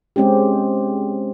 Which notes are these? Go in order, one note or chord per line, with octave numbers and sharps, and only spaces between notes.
G#3 C4 C#4 G4